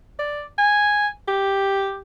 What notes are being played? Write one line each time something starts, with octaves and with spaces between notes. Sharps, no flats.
D5
G#5
G4